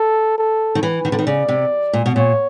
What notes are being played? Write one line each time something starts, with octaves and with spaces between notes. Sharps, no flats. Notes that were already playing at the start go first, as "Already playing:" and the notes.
Already playing: A4
A4
D#3
E3 B4
D#3
D3
D#3
C#3 D5
C3
A#2
B2
A#2 C#5